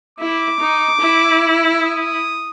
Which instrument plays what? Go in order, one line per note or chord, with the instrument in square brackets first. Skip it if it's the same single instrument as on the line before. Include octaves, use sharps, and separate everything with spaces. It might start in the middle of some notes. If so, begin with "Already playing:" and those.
[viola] E4 [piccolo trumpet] D6
[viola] D#4
E4
[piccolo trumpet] D#6